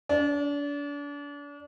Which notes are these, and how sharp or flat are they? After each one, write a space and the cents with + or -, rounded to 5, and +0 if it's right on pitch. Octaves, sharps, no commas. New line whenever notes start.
D4 -35